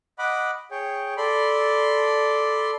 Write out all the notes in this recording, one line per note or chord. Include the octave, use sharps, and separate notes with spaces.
D#5 F#5 B5 D6
G#4 C#5 G5
A4 D5 B5 C6